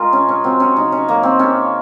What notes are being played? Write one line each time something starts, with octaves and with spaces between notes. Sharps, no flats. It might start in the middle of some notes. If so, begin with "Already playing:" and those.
Already playing: G#3 F4 G#4 A#4 D#5
C#3 C#4
C#4
F#3 C4
C#4
C#3 D#4
C#4
F#3 A#3
C4
C#3 C#4